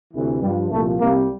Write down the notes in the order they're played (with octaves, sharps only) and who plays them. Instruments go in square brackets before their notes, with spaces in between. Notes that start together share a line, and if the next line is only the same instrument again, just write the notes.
[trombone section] D2 C3 E3
G2 G3
F3
C2 A#2 F3 A3
C2 C3 G3 A#3